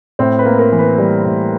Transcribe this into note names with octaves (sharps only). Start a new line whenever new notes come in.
A2 C4 C5
B4
A#3
A#4
E3
B4
G3
A2